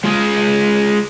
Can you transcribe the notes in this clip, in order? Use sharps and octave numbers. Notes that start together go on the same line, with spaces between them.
G#3 F4 G#4